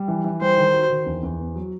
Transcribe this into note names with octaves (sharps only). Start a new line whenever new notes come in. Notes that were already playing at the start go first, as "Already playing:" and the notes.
Already playing: G3
E3
E3
G3 C5
D#3
F#4
D#3
E2
E2
B3
F#3